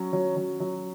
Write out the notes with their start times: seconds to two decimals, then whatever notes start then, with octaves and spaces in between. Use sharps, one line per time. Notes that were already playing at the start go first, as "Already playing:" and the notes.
Already playing: F#3 C#4
0.13 F#3
0.36 F#3
0.60 F#3